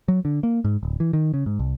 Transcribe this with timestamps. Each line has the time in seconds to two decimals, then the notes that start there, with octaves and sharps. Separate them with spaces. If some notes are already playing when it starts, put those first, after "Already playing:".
0.08 F#3
0.25 D3
0.43 A#3
0.64 G#2
0.83 D1
1.00 E3
1.13 D#3
1.34 C#3
1.46 G#2
1.59 C2